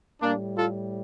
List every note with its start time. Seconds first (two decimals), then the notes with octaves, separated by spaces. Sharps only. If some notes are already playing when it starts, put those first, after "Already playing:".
0.22 A2 G3 A#3 D4
0.55 F4 A4